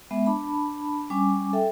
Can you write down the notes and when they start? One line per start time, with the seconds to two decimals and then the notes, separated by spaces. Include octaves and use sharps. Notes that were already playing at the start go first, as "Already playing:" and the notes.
0.11 G#3 B3 E5
0.26 D4 A5 B5
1.10 G3 C#4 G#5 D6
1.53 A4 E5 G5